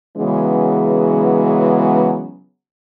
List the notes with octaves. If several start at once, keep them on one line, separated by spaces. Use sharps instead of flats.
C#3 E3 F#3 G#3 B3 C#4